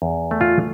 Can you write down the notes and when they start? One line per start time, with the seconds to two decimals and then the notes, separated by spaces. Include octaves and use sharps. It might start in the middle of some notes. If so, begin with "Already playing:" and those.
0.02 E2
0.31 A3
0.41 F4